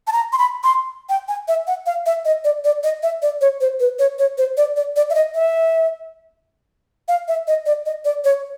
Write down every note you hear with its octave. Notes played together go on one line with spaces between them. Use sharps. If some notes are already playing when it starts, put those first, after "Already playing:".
A5
A#5
C6
B5
C6
G5
G#5
E5
F#5
F5
E5
D#5
D5
D5
D#5
E5
D5
C#5
C5
B4
C#5
C#5
C5
D5
D5
D5
E5
D#5
E5
F5
E5
D#5
D5
D#5
D5
C#5